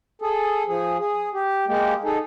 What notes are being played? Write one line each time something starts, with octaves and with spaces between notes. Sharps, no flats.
G#4 A4
F3 G#4
G#4
G4
G#3 A#3 G4
D#4 G#4 A4